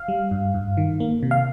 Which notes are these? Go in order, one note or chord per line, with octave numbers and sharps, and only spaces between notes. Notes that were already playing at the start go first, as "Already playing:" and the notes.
Already playing: F5
G3
G2
G2
D#3
A#3
C3
F5